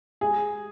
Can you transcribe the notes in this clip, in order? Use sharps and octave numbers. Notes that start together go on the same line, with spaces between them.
G#4